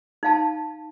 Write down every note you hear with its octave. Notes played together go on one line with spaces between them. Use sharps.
D#4 F5 A5